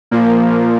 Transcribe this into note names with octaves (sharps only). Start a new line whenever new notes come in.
A#2 F3 A#3